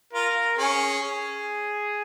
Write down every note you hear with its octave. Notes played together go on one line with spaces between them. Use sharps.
F4 A#4
C#4 G#4
G#4